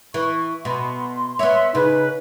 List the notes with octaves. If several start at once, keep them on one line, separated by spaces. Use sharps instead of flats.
E3 C#6
B2 C6
B3 C#5 E5
C#3 D#4 B4